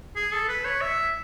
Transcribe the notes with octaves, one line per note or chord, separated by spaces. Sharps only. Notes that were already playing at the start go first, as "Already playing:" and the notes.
G#4
A4
B4
C#5
E5